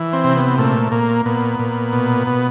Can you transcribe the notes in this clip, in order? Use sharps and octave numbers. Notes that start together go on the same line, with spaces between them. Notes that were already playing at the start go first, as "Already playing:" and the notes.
Already playing: E3
C4
C3
B3
A#2 A3
A#2 A#3
A#2 B3
A#2
B2
B2